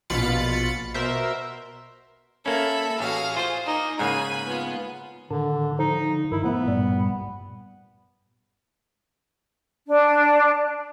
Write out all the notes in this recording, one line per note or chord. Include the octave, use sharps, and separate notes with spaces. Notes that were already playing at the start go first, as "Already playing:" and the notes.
A#1 B2 F4 B5 A6 C#7
B2 A#4 C5 E5
A#3 C#4 A4 E5 B5
A1 F#4 G#4 F5
F4 C5
A#3 D#4
G#2 C#3 A#3 G#5 B5 D#7
B3 F4
A2 D3 D#3 D4
D3 F3 D#4
G2 D#3 E4
A2 F3 A3 B3
G2 A#2 G3
D4